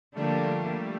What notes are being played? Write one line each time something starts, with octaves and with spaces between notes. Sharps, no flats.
D3 F3 G3 A3 A#3 D4 G4